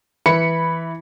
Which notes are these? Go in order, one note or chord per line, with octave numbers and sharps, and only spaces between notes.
E3 B5 C#7